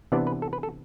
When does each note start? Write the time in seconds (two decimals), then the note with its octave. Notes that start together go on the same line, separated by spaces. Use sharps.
0.12 C3 E3 B3 D4 D5
0.27 B4
0.42 A4
0.53 B4
0.63 A4